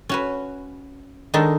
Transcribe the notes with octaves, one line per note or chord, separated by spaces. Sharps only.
C#4 F#4 B4
D#3 G#3 D4 D#4 A4